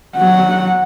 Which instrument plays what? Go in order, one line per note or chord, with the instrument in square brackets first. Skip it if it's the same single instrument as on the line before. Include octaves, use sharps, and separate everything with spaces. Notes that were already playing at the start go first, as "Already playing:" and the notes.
[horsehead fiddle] F#3 F#5